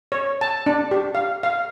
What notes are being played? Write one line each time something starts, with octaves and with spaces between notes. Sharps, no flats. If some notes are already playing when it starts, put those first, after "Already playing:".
C#5
A5
D4
G4
F5
F5